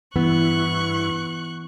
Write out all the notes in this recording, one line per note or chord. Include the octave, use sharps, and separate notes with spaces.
G2 E3 B3 E4 C#6 F#6